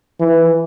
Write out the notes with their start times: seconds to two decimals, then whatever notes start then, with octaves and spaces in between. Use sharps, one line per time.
0.20 E3